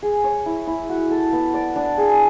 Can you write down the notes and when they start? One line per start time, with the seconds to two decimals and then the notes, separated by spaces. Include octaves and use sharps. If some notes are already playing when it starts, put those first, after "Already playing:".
0.02 G#4
0.24 C#5
0.46 E4
0.67 E4
0.89 F#4
1.11 A4
1.32 B3
1.54 D5
1.76 D4
1.97 G#4